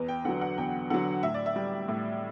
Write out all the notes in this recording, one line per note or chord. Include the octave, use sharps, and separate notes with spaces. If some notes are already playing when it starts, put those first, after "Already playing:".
Already playing: E2 B4
G5
D3 F#3 F#5
F#5
E2 G5
D3 F#3 F#5
A2 E5
D5
E5
G3
A2